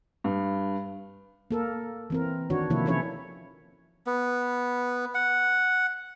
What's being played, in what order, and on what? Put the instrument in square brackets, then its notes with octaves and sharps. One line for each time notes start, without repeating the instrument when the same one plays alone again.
[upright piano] G2
[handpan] A#3 A4 A#4
E3 C4 A#4
D#3 D4 F#4 C#5
C3 D#3 F3 A#3 E4 C#5
E3 F3 C#4 E4 A4 C#5
[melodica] B3
F#5